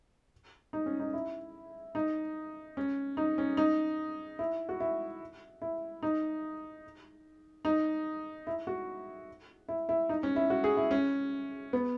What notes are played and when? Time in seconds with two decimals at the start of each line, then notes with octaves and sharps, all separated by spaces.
0.73 D#4
0.86 C#4
1.00 D#4
1.13 E4
1.95 D#4
2.77 C#4
3.17 D#4
3.38 C#4
3.57 D#4
4.39 E4
4.69 F#4
4.80 E4
5.62 E4
6.03 D#4
7.65 D#4
8.47 E4
8.67 F#4
9.68 E4
9.89 E4
10.09 D#4
10.23 C#4
10.36 E4
10.50 F#4
10.64 G#4
10.77 E4
10.91 C#4
11.73 B3